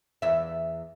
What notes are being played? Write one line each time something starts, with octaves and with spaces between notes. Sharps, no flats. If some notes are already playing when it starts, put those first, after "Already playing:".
E2 E5